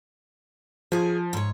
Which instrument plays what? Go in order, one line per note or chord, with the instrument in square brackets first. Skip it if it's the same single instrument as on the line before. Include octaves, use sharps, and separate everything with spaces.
[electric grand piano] F3 [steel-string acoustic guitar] G#4 G#5
[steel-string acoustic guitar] G#2 C#5